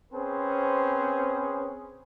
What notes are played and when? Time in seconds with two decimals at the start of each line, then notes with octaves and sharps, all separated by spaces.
0.13 C4 C#4 G#4 B4 C5